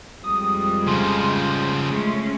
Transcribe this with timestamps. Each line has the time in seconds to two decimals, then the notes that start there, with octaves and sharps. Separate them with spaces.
0.24 F2 G3 G#3 D#6
0.87 C#3 F3 C6
1.90 G#3 A3 C#4